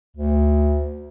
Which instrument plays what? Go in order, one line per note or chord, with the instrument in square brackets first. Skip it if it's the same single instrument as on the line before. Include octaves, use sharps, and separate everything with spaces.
[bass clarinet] D2